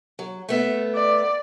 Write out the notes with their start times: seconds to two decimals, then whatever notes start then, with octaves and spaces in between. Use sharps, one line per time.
0.19 F#3
0.49 A3 B3 E5
0.94 D5